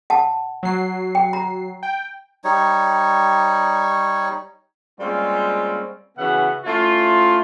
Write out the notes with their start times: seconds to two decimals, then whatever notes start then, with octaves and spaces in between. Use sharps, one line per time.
0.10 F#5 A5
0.63 F#3 C7
1.15 G5
1.33 A#5
1.83 G5
2.44 G3 D#4 C#5
5.00 G3 G#3 A#3 C4 C#4 F4
6.17 C#3 E3 B3 F#4 E5 F#5
6.65 A3 C#4 E4 F4